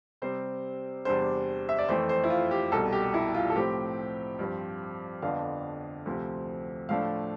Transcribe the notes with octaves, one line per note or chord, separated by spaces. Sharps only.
C3 G3 C4 C5
E2 C3 G3 D4 C5
E5
D5
F2 E3 A3 C5
C5
E4
F4
G4
C2 B2 G3 A4
G4
E4
F4
A4
A2 F3 C4 G4
G2 F3 C4
F2 D3 F3 B3 D4 F5
D2 C3 F3 C4
A2 F3 A3 D4 F5